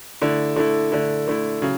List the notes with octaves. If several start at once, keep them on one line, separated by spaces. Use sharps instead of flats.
D3 A3 E4
D3 A3 E4
D3 A3 E4
D3 A3 E4
C#3 F#3